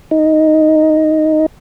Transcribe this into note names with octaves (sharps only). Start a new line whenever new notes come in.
D#4